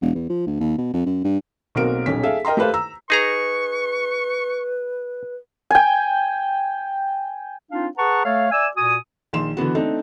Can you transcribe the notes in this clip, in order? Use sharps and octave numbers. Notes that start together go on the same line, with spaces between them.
E1
E2
F3
D2
D#2
B2
F2
F#2
G2
B1 A#3 C4 F#4 A#4 D7
D#1 B1 C#4 B6
G#4 A4 E5 F5
A#4 D#5 G5 A#5 C6
A3 G4 A4 B4 C5 F5
A#5 E6
D#4 G#4 B4 A#5 C#6
G5 G#5
C4 D4 D#4 F4 F5
G#4 B4 F#5 A5 A#5 C#6
A3 A4 C#5 F5
D5 E5 G#5 E6
A#2 F#4 G#5 D#6
A#1 D#3 C6 E7
D3 E3 B3 F#4
A3 C4 D4 D#4